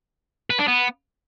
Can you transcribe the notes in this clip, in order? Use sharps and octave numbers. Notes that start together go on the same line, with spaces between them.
B4
D4
B3